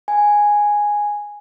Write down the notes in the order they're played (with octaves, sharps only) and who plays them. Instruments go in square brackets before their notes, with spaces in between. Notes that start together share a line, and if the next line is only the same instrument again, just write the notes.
[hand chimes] G#5